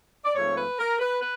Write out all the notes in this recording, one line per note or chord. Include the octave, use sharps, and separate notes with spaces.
D5
G#2 F3 A3 C4 C#5
B4
A#4
B4
B4